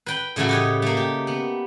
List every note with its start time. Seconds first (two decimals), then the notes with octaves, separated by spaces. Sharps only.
0.06 B4 G5 B5
0.36 A2 C#3 E3 F#3 A3 F#4
0.49 G4 C#5 D#5
0.82 A3 A#3
0.97 G4
1.27 B3